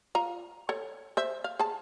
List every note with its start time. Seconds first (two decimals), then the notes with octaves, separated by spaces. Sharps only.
0.15 F4 A#5
0.69 A4 C#5
1.17 C5 E5
1.44 F5
1.59 G#4 A5